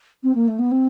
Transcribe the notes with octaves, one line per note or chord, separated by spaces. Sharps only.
C4
A#3
A3
B3
C4